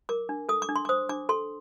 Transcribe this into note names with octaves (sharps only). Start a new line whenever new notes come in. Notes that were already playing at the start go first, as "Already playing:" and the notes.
A#4 D6
D4
A4 D#6
D6
D4
C6
D6
C5 D#6
D4 D6
A4 C6